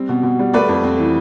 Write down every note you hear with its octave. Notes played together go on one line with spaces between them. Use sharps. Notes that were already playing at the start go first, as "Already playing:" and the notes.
Already playing: G3 C4
B2
B2
G3
A3 B4 D5
F2
C4
E3